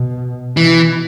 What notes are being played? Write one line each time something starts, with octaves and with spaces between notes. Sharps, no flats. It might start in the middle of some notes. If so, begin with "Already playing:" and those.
Already playing: B2
B2 E3